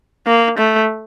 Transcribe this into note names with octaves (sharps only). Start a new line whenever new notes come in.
A#3
A3